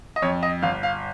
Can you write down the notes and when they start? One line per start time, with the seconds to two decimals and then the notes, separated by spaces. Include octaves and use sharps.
0.16 D#5
0.22 F2 C#5
0.43 D#5
0.62 G1 F5
0.83 F5